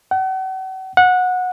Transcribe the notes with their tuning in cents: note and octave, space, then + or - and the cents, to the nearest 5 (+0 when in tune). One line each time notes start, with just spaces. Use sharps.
F#5 +40
F#5 -20